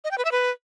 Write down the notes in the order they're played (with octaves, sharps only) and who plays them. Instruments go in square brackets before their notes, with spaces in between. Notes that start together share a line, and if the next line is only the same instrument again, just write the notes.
[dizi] D#5
G5
B4
E5
B4